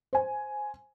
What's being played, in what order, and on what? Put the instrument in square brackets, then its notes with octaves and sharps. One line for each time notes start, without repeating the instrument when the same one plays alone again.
[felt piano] C5 G#5